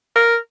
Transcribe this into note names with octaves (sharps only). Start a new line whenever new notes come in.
A#4